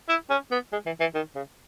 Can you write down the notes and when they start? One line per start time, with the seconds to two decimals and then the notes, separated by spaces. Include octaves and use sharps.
0.09 E4
0.30 C#4
0.51 B3
0.73 G#3
0.86 E3
1.01 E3
1.15 D#3
1.35 C#3